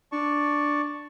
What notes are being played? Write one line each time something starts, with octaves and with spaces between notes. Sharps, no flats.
D4 D5 A5 C#6